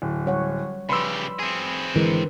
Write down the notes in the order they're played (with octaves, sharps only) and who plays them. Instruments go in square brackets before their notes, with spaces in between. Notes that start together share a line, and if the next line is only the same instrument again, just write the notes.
[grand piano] D1
[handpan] G3 C#5 F#5
[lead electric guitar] C#3 G4 [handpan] F3 B4 D5 [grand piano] B5 C6 E6
[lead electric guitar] C4 G#4
[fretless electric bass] G#1 E3 G#3 [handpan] D3 A#4 B4